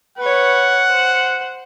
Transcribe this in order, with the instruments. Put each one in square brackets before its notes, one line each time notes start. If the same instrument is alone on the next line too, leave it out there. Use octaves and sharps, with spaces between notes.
[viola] B4 C#5 [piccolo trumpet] F#5
[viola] C5